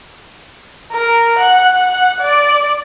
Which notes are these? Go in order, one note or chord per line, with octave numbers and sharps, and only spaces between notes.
A#4
F#5
F#5
D5